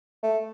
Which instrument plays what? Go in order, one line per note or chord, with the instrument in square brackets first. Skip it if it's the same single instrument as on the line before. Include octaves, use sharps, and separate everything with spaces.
[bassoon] A3